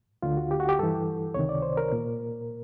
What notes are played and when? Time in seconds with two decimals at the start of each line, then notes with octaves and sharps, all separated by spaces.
0.22 D2 D3 F4
0.37 F#4
0.51 G4
0.60 F#4
0.69 G4
0.79 G2 E3 A4
1.34 C#2 C3 D#3 C#5
1.49 D5
1.62 C5
1.77 A#4
1.92 A#2